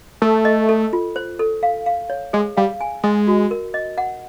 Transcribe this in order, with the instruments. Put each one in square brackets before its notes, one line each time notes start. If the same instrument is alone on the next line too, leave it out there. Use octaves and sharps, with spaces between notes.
[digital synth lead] A3 [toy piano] A4
[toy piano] D#5
A4
F4
C5
A4
F5
F5
C#5
[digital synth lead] G#3 [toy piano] G#4
[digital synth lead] G3 [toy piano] F5
[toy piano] G#5
[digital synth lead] G#3 [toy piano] D#5
[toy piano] F#4
A#4
D#5
F#5